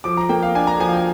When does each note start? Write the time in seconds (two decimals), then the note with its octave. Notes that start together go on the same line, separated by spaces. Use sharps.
0.04 F3 D6
0.17 A#5
0.29 A#3 G5
0.42 F5
0.55 D4 G#5
0.67 A#5
0.80 F3 G#5
0.88 F5
0.93 G5